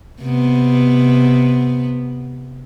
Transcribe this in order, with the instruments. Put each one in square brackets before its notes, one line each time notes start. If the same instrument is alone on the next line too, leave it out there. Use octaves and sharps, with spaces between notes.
[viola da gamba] C3 B3